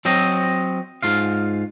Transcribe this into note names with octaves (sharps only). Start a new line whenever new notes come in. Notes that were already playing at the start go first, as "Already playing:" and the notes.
F#3 C4 C5 D#5
G#2 F4 F5